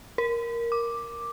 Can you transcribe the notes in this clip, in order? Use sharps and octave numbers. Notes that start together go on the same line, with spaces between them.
A#4
D6